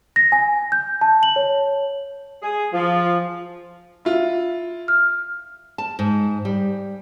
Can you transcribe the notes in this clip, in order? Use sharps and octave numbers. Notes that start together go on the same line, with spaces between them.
A#6
G#5
G6
A5
F#7
C#5
G#4
F3
E4 F4
F6
A5
G#2
G3